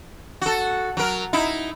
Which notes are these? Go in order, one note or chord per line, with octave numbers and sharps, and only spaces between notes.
F#4 A4
F#3 A#4
D#4 E4